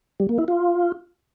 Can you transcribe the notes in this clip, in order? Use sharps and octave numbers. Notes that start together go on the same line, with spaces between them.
G3
A#3
E4
F4